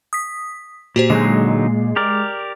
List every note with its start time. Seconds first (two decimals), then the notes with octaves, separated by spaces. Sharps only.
0.13 D#6 B6
0.96 A#2 F#4 G4 C5
1.10 D3 F#3 G#3 D#4 C7
1.96 G4 A#4 D5